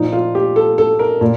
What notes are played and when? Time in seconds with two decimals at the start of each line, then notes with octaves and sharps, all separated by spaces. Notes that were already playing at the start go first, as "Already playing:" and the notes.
Already playing: A#2 F3 D#4
0.13 F4
0.35 G4
0.56 A4
0.78 A4
0.99 A#4
1.21 A#2